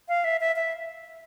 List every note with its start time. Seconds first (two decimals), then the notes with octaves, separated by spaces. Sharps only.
0.08 F5
0.24 E5
0.41 E5
0.56 E5